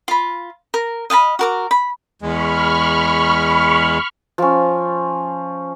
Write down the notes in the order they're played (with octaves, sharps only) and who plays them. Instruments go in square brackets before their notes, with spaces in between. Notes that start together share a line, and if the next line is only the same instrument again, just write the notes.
[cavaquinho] F4 B5
A#4
D#5 F5 A5 B5
F#4 A#4 D6
B5
[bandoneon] E2 G#3 [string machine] B5 C#6 F6
[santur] F3 C#4